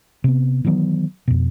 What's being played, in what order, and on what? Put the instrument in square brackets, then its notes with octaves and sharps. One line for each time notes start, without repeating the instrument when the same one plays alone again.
[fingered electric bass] C3 B3
D#3 E3 F#3 B3
F2 B2